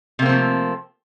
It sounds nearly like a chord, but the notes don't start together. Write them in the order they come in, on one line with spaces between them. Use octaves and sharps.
C3 A#3 C4 F3 A3